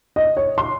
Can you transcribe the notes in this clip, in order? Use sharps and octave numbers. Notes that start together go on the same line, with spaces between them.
D#5
C#5
C6